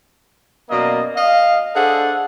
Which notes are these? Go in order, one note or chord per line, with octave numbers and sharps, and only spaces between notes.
F#2 B2 A#3 D5 D#5
D#5 F5
D4 G#4 A4 C5 F#5